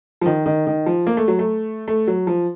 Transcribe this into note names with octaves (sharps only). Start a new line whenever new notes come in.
F3
D#3
D#3
D#3
F3
A#3
A3
F#3
A3
A3
F#3
F3